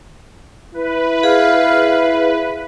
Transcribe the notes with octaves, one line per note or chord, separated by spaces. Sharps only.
E4 B4
G#4 F5